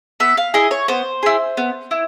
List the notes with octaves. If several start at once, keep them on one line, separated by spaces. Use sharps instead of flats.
B3 E5
F5
E4 G#4 D#5
C#5
B3 C5
E4 G#4
B3
E4